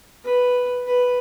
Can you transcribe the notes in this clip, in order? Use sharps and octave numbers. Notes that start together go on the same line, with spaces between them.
B4
B4